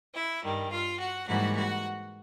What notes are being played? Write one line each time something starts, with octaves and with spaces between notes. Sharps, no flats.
E4 E5
G2 D#3 G3
F4 F5
F#4 F#5
G#2 E3 G3 A#3 F#4 F#5
F#4 F#5